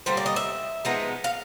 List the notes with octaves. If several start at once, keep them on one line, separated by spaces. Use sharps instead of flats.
D3 G3 A#3 C5
D5
D#5
E5
F3 G#3 B3 D#4
F5